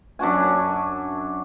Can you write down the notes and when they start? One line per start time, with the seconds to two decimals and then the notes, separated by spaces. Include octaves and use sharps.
0.19 F#2 D4 F#4 G#5